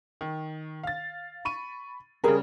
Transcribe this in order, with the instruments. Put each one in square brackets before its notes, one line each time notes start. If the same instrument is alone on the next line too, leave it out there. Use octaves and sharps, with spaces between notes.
[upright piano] D#3
F5 A6
B5 C#6 D#7
[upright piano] C#3 G3 [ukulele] G#4 A#4